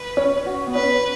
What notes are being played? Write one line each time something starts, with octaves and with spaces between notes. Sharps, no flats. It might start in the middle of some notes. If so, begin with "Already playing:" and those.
Already playing: B4
C#4
F#4
B3
C#4 B4